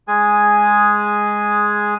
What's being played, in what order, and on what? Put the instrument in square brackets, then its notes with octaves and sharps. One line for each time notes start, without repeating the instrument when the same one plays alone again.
[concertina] G#3 G#4 G#5